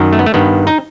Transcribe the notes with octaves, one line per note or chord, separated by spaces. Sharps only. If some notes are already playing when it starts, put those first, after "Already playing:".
Already playing: F#2 D#3
A3
B3
A3
G2 D#3 B3
D#4